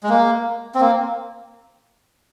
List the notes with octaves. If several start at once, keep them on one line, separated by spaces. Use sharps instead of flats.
G#3
A#3
C4
A#3